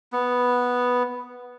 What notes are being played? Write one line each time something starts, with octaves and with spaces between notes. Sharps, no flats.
B3